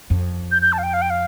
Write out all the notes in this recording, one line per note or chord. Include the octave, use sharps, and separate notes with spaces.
F2
G6
G6
A5
F5
G5
F5
G5
F5